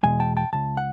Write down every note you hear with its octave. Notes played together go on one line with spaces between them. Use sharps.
E2 B2 G#3 G#5
G5 A5
G5 A5
C#2 C#3 A5
F#5